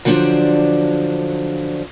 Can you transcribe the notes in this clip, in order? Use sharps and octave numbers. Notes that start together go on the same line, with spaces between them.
D3 F3 F#3 D4 C5 D5